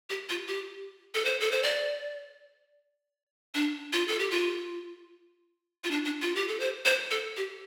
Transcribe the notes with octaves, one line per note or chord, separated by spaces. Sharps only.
G4
F4
G4
A4
C5
A4
C5
D5
D4
F4
A4
G4
F4
F4
D4
D4
F4
G4
A4
C5
C5
A4
G4